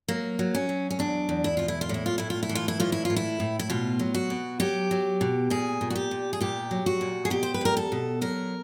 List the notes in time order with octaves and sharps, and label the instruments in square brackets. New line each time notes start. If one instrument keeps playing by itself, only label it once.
[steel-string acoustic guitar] F#3 A#3
F#3
C#4
F#3
C#4
E2 D4
E2
E4
B2 F4
E4
F4
A2 E4
F4
A2 E4
F4
E4
E3
F4
E4
A2 F4
E4
A2 F4
E4
A2
E4
B2 F4
F#3
F#4
B2
F#3 G4
F#3
B2
A#2 G#4
A#2
F#4
G4
A#2
G#4
A#2 G4
F#3
F#4
A#2
G#4
B2 G4
C5
B4
E2 A#4
A4
B2
F#3 A#4